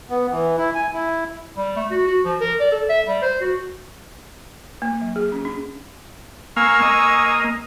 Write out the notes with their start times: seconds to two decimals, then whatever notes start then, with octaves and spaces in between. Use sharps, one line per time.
0.10 B3
0.31 E3
0.58 E4
0.75 G#5
0.93 E4
1.57 G3
1.76 A3
1.91 F#4
2.07 F#4
2.25 F3
2.40 A#4
2.60 D5
2.72 A4
2.89 E5
3.08 G3
3.22 C5
3.41 F#4
4.82 A#3
5.01 F#3
5.16 G#4
5.32 C#4
5.45 D4
6.57 A#3 F5 G#5 C#6 E6
6.82 A#3 D#5